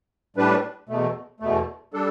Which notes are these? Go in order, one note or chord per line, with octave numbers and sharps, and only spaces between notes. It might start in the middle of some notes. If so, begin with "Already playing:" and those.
A2 G3 D4 B4
E2 B2 A3
E2 B2 A3
G3 D4 A4